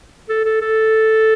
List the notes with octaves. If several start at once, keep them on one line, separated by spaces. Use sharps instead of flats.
A4
A4
A4